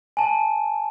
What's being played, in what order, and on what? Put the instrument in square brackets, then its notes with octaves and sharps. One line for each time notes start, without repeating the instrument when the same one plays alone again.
[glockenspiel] G#5 A5